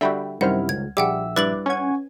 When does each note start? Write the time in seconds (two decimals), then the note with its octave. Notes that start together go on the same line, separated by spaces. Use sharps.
0.01 D3 G3 F#4 E5 G5 B5
0.41 F#2 C3 D#3 G3 E4 C5 F#5 F6
0.69 C#2 G#6
0.97 A#1 G3 G#4 E5 F#5 G5 D6 E6
1.36 G2 E4 B4 D5 D6 F#6 A6 F#7
1.66 C#4 F#5 G#5 C#6 G#6